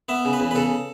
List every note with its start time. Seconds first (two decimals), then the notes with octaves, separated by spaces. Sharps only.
0.09 B3 E5
0.25 C#3
0.33 B4
0.40 E2
0.51 B4
0.55 C#3 A4